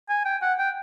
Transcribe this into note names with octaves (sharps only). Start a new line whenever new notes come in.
G#5
G5
F#5
G5